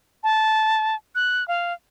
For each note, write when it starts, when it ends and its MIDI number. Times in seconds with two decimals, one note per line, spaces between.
0.24 0.95 81
1.15 1.46 90
1.48 1.73 77